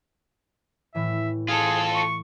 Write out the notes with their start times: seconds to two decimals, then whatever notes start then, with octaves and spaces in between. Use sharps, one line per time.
0.95 A2 E3 E5
1.48 F4 G#4 A4
1.95 C#6